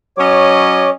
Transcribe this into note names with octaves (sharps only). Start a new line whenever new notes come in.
F#3 C#4 C#5 D#5 D6